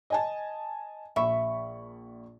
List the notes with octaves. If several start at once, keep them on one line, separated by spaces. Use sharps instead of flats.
D#5 G#5 A5
A#1 E5 B5 C#6